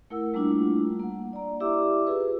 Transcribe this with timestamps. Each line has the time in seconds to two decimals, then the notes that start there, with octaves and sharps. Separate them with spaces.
0.10 A3 E4 A#4 F#5 E6
0.34 G3 A3 A#3 D4 E4 F4
0.99 A#3 F#5
1.33 D5 A#5
1.60 E4 G4 D5 E5 D6 E6
2.07 F4 G4 G#4 B4